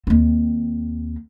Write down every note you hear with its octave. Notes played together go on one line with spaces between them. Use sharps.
D#2 C4